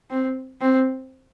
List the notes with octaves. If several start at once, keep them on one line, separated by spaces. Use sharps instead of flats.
C4
C4